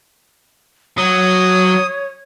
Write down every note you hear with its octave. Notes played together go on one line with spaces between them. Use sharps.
F#3 C#5 D#6